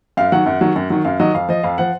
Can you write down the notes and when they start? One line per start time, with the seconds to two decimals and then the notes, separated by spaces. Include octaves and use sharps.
0.17 F#2 F5
0.32 D#3 F#3 F#5
0.46 F#2
0.61 D#3 F#3
0.76 F#2
0.90 D#3 F#3
1.05 F#2 F5
1.20 D#3 F#3 D#5
1.34 F2 F5
1.49 F3 D#5
1.63 F2 F5
1.78 F3 F#5